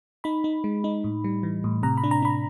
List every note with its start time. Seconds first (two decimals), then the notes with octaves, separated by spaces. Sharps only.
0.24 D#4 B5
0.44 D#4
0.64 G#3
0.84 D#4
1.04 A2
1.24 G3
1.43 E3
1.64 A2
1.83 C3 A#5
1.98 B5
2.04 D4
2.11 A#5
2.22 D4 B5